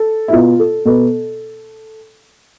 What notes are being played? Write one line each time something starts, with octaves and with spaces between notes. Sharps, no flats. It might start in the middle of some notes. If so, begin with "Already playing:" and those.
Already playing: A4
E4
B2 B3 F4
A4
B2 B3 A4